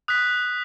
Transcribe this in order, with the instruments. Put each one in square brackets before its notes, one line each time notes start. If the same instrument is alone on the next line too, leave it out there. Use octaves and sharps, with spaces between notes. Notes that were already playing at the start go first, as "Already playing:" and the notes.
[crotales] D#6 F#6 B6